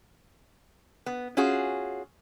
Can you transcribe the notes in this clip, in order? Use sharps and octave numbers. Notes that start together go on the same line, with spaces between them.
B3
C#4 F4 F#4 G#4